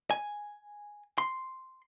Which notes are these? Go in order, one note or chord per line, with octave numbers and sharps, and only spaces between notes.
G#5
C6